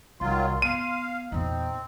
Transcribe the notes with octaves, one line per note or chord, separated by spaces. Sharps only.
C2 D#3 F#3 F4 C6
B3 F5 D#7
E2 A#2 C4 D#4